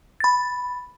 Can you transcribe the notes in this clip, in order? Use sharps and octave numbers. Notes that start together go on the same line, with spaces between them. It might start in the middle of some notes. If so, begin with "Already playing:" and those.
B5 A6